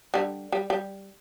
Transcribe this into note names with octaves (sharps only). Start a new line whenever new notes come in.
D3 G3
G3
G3